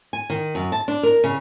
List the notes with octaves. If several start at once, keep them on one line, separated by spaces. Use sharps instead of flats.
G#5
D#3
F#2
A5
D4
A#4
C#3